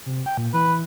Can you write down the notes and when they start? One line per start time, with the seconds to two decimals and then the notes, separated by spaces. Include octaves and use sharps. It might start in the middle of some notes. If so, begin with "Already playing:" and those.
0.06 C3
0.26 G5
0.37 A#2
0.53 E3 B4